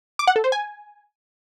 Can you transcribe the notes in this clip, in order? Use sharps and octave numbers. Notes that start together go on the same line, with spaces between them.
D6
F#5
A4
C5
G#5